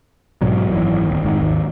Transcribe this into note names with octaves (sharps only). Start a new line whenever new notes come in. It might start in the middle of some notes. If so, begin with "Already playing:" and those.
B1 G#2 B2 F#3
G#1 F#2 C#3 E3
D1 D#2
F1 G#2 D#3
G#1 D#2